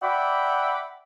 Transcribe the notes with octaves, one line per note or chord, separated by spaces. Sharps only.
D5 E5 F#5 G5 B5 D6